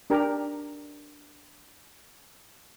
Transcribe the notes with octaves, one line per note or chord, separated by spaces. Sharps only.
D4 G4 A#4